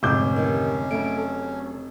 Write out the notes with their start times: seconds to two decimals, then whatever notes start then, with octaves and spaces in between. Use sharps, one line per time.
0.03 F1 G#2 D3 C#4 B4 D6 G6
0.36 D#3 G4
0.91 C#3 F#3 A3 D7
1.18 A4